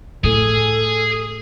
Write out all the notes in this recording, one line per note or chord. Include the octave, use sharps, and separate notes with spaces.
A2 G#4 A4